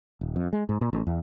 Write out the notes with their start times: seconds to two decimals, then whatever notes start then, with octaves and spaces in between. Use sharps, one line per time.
0.21 D#1
0.36 F2
0.53 G#3
0.69 G#2
0.81 A#2
0.93 A1
1.07 E2